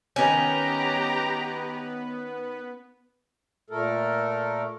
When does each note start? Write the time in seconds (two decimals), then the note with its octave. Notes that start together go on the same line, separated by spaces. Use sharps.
0.16 D#3 B3 C#4 G4 B4 A#5
3.70 A#2 A3 A4 A#4